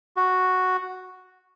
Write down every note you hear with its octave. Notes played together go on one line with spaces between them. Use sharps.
F#4